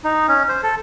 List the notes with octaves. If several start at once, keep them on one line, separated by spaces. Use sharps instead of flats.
D#4
C#4
C5
A4